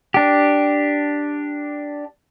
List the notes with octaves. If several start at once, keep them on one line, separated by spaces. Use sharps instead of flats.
D4 G4